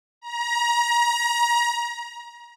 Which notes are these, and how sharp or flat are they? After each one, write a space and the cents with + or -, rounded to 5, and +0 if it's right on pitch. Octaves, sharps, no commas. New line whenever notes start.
A#5 +30